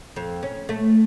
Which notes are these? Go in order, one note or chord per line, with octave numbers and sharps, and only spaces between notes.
F2
C#4
A3